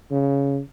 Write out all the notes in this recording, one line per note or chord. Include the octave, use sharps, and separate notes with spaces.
C#3